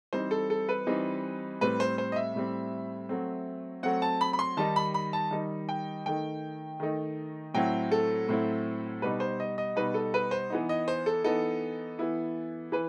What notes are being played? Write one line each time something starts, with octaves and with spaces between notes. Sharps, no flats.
E3 G3 C4 D#4 C5
A4
A4
B4
E3 G3 C4 D#4
A2 G3 C4 B4
C5
C5
D#5
E5
A2 G3 C4
F#3 A3 C4
F#3 A3 C4 F#5
A5
B5
B5
C6
D#3 G3 D#4 A5
B5
B5
A5
D#3 G3 D#4
G5
D#3 A3 D#4 G5
D#3 A3 D#4
A2 F#3 C4 E4 G5
A4
A2 F#3 C4 E4
B2 G3 D#4 B4
C5
D#5
D#5
B2 G3 D#4 B4
A4
B4
C5
E3 B3 D#4
D#5
C5
A4
E3 B3 D#4 A4
E3 B3 E4
E3 B4